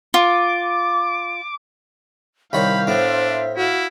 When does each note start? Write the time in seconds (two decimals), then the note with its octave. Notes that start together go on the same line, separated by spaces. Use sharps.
0.14 F4 D6
2.53 C2 D#3 C#5 F5 B5 G6
2.87 A2 B3 D4 C5 E5
3.57 E4 F#4 F5